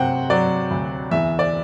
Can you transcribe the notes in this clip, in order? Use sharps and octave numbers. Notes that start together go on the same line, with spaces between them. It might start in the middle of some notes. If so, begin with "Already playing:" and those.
Already playing: C3 F#3 C5 F#5 G5
F#3 D5
D2
E2 E5
D5